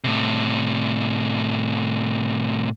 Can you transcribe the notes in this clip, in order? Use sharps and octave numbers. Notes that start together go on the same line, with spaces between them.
A2 C3